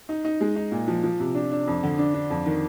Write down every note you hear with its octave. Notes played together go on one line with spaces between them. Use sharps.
D#4
D#4
G#3
D#4
A#2
F3
F3
C3
D4
D4
F2
D3
D4
D4
F2
D#3